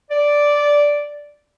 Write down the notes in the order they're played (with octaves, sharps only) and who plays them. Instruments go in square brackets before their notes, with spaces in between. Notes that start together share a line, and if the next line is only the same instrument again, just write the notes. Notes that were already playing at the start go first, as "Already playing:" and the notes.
[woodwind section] D5